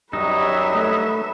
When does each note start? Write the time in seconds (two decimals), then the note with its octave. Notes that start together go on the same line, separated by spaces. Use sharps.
0.13 F#2 F#3 G3 D#4 B4 E5
0.75 A3